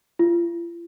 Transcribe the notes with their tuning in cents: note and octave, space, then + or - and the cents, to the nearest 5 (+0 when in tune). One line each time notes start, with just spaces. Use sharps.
F4 -45